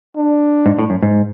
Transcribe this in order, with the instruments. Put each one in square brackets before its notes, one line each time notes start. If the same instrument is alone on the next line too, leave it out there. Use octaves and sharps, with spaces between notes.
[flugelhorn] D4
[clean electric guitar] G#2
A2
F#2
G#2